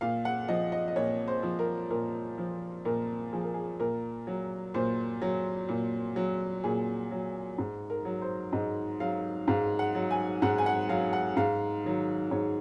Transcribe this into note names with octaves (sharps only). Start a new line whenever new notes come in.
A#2 F5
F#5
F3 D#5
D#5
D#5
A#2 C#5
C5
F3
A#4
A#2 A#4
F3
A#2 A#4
F3 G#4
A#4
G#4
A#2 A#4
F#3
A#2 C5
F#3
A#2
F#3
A#2 G#4
F#3
G#2
A#4
F#3
C5
G#2 D#5
F#3 F5
G#2 F5
F#5
F#3
G#5
G#2 F#5
G#5
F#5
F#3 F5
F#5
G#2 F5
D#3 F#3
G#2 C#5